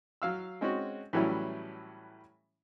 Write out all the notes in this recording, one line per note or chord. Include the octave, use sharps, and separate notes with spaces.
F#3 F5 E6
G#3 C4 C#4 D#4 F#4
A2 E3 F#3 G3 C#4 E4